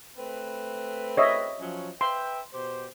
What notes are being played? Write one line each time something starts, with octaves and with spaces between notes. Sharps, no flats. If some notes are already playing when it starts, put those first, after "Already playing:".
A3 C4 B4
C#5 D#5 E5
F3 F#3 C#4
B4 E5 G5 C6
B2 G4 C5